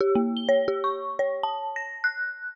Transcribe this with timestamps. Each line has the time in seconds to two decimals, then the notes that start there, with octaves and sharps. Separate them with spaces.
0.01 G4
0.15 A#3
0.37 G7
0.49 C#5
0.68 G4
0.84 C#6
1.19 C#5
1.43 A5
1.76 A#6
2.04 F#6